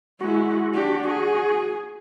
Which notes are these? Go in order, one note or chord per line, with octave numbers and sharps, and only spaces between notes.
G#3 E4 F#4
D4 G4
G#4